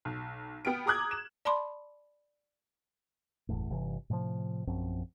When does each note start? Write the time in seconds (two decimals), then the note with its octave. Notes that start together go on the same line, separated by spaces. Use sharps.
0.05 B1
0.65 B3 G5 F6 D7
0.86 G#4 A#5 D6 D#6 F#6 G#6
1.11 E7
1.45 D5 A5 B5 C6 D6
3.49 F#1 E2 A2
3.70 G1 C3 E3
4.10 A2 C3 E3 F3
4.67 A#1 F#2 F3 C4